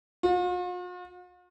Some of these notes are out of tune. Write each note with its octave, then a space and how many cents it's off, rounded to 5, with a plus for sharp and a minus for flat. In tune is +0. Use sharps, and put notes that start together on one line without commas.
F4 +45